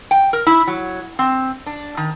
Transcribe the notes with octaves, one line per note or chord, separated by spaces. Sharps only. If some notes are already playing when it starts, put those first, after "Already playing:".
G5
A#4
E4
F#3
C4
D4
D#3